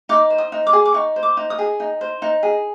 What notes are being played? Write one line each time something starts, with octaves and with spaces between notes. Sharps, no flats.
D#4 D6
C5
D#6
D#4
D6
G#4
D6
D#4 C#6
C5
D6
D#4
D#6
G#4
D#4
C5
D#4
G#4